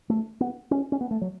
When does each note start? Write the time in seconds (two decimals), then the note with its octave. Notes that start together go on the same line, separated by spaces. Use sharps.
0.10 A3
0.41 B3
0.71 C#4
0.92 C#4
1.01 B3
1.11 A3
1.21 F#3